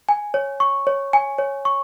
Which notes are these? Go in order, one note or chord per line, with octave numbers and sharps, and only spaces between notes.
G#5
C#5
C#6
C#5
G#5
C#5
C#6